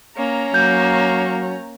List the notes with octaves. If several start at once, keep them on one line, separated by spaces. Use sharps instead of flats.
A#3 C#4 A#5
F#3 A#3 G6